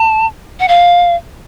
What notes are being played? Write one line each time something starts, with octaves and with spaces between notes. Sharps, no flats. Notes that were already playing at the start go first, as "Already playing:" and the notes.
Already playing: A5
F#5
F5